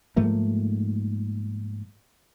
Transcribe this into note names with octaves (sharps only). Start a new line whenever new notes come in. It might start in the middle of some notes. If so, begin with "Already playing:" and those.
G#2 F3 A3 A#3